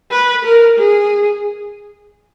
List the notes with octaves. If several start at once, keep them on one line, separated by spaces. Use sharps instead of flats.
B4
A#4
G#4